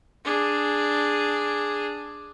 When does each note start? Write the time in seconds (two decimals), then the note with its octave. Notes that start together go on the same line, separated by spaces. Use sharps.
0.25 D4 G#4